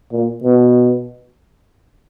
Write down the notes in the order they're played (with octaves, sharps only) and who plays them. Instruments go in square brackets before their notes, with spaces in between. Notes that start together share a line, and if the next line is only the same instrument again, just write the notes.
[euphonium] A#2
B2